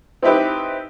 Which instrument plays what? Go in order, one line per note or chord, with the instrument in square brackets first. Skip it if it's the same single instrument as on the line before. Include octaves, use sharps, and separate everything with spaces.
[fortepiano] C4 D#4 E4 G4 B4